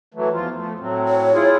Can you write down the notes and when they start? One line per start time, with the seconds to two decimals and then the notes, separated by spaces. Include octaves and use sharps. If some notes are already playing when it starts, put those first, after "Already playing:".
0.14 E3 F#3 A3
0.33 E2 F3 F4
0.55 F3 A3
0.80 A2 F#3 C4
1.08 C#5
1.34 E4 F4 G#4